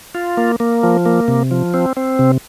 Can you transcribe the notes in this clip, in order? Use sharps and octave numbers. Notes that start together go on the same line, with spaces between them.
F4
A#3
A#3
F3
A#3
C3
F3
C4
C4
C3